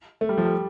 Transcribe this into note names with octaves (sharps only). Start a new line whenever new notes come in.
A3
G3
F3
G3